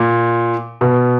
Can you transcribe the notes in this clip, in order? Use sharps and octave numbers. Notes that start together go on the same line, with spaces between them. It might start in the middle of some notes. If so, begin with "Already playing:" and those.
Already playing: A#2
B2